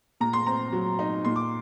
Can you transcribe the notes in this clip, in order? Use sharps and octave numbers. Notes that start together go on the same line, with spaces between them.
A#2 A#5
C6
C4 A#5
F#3
D#4
A#2 C6
D6